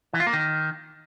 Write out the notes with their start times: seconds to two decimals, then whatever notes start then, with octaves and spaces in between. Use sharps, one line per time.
0.13 E3
0.20 F4
0.27 A#3
0.33 D#3